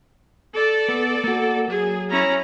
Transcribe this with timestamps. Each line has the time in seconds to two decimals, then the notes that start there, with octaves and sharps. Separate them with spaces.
0.53 A4 D5
0.88 B3
1.24 A#3 F#4
1.68 F#3 G#4
2.10 C#4 E4 A#5